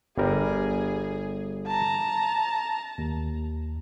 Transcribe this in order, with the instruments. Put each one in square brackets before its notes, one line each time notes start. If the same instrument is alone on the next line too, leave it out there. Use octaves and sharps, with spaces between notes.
[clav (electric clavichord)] G1 G3 A#4 [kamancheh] G#4
[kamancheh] A5 A#5
[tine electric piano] D#2